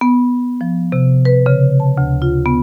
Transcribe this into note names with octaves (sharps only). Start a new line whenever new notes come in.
B3
F3
C3
B4
C#3
A5
D2
F4
B3